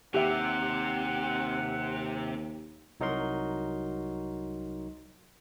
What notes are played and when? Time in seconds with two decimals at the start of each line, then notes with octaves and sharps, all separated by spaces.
0.14 D#2 C3 G4 E5 F#5
3.00 C2 F#3 D#4 F#4 A#4 C6